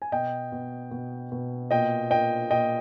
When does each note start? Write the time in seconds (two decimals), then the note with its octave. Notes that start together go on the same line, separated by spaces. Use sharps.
0.02 G#5
0.12 B2 D#5 G5
0.52 B2
0.91 B2
1.32 B2
1.71 A#2 D#5 G5
2.11 A#2 D#5 G5
2.50 A#2 D#5 G5